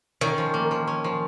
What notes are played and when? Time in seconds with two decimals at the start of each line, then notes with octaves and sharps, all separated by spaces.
0.21 D#3 C#4
0.38 F3
0.54 A#3
0.71 F3
0.87 C#4
1.04 F3